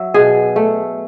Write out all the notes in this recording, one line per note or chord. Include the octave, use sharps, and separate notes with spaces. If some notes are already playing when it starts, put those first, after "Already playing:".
Already playing: F#3 E5
B2 G#4
A3